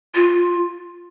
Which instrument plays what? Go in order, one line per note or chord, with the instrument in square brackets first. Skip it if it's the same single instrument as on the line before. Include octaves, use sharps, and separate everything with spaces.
[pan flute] F4